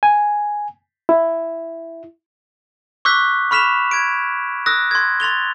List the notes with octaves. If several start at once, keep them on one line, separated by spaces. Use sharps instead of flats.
G#5
E4
C#6 D6 E6 F#6 G6 B6
B5 C#6 F6 B6 E7 F7
G#6 D7
D#6 E6 F#6 A#6
C6 G#6
C6 A6 F7 G7